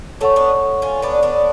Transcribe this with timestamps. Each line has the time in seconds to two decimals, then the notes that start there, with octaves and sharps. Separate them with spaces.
0.21 A3 C#4 A4 C#5 F#5 C#6
0.36 B3 D4
0.82 C#4 F4
1.02 B3 D4
1.23 B3 D4